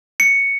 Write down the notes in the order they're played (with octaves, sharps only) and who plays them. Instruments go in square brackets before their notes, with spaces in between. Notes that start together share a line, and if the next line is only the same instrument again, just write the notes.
[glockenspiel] C#7